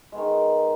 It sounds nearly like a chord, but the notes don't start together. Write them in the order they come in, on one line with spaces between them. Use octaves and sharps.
G#3 B3 D#3